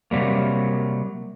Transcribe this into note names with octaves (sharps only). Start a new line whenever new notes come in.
C3 F#3 G3 A#3